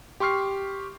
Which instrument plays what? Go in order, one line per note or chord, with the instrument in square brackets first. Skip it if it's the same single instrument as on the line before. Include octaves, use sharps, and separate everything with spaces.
[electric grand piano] G4 C6 C#6 F6 C7